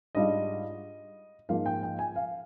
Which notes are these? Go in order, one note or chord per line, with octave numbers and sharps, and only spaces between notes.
G#2 G3 D4 F4 D#5
G#2 F3 A#3 F4 F5
G5
G5
G#5
F5